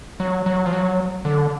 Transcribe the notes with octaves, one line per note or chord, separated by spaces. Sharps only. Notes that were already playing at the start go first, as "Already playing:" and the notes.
F#3
F#3
F3
F#3
D3